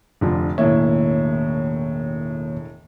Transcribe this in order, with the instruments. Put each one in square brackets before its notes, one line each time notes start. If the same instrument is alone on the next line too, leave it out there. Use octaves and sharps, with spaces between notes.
[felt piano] F1 D3 F3
[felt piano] E1 A2 E5 [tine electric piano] D#3 A#3 C#5